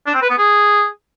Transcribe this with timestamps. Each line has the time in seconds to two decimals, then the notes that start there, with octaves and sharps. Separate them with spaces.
0.06 D4
0.14 C4
0.22 B4
0.30 B3
0.38 G#4